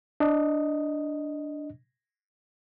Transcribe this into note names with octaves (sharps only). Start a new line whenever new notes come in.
D4 D#5